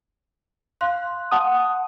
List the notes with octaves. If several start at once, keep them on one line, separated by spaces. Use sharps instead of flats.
F5 C6 F#6
F#5 A5 D#6